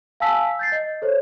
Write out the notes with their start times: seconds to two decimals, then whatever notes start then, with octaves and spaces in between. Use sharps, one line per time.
0.20 F5 G#5 A5 E6 B6
0.59 G6 A6 C7
0.72 D#5
1.02 A4 C5 C#5